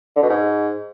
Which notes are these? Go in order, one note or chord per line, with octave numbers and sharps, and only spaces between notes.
D3
B2
G#2